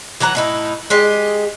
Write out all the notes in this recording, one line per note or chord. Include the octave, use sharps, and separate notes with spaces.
E3 F#3 F#5 A#5
A2 D#4 E4
G#3 G4 D#5